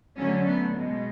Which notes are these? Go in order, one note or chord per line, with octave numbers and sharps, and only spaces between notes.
D3 F#3 A3 C#4
B3
B2 G#3